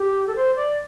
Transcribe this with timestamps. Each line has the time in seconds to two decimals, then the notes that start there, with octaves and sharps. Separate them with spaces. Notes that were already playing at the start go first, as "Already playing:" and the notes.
Already playing: G4
0.27 A4
0.35 C5
0.56 D5